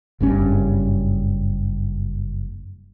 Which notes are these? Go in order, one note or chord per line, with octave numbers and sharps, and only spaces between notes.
F#1 G2 G3 C#4